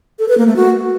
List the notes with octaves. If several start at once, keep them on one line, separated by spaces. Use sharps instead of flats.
A4
B4
A#3
A3
F#4